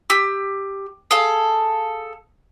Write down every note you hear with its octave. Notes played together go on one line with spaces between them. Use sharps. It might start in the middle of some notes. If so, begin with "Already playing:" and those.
G4 E6
G#4 A4 F5